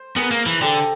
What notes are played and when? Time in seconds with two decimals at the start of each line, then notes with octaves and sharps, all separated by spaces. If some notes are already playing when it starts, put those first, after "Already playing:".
Already playing: C5
0.16 B3 G#4 A#4
0.31 A#3
0.46 E3
0.61 D3 G4 A4